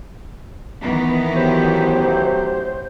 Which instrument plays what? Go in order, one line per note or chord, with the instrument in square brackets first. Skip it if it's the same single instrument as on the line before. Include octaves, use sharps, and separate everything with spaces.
[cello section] D#3 E3 B3
[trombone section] A1 F#3 G4 [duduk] C5